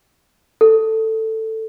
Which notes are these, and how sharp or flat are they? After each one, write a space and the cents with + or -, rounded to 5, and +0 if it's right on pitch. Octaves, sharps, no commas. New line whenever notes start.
A4 +10